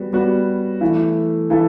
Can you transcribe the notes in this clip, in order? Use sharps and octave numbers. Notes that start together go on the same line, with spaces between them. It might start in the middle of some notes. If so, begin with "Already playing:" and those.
Already playing: G3 B3 F#4
G3 B3 F#4
E3 A3 E4 A4
E3 A3 E4 A4